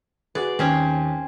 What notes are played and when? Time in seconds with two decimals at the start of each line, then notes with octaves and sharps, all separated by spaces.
0.35 F#4 G#4 B4 D5
0.59 D#2 C4 C#4